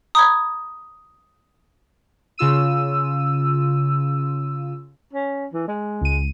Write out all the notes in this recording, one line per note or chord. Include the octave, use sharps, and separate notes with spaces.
A#5 B5 D#6 G#6
C#3 F4 E6 D#7
C#4
E3
G#3
C#2 D#7